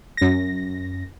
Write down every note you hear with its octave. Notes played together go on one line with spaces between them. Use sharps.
F#2 A#6